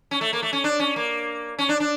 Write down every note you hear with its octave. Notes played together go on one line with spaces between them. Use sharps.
C#4
A3
A#3
A3
C#4
D4
C#4
A#3
C#4
D4
D4